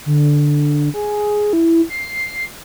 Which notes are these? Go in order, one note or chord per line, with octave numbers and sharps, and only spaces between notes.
D3
G#4
E4
C7